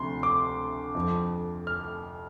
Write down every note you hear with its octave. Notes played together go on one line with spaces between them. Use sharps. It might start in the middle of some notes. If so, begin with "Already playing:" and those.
Already playing: D2 C3 F3 C6
D6
F2 F3
F6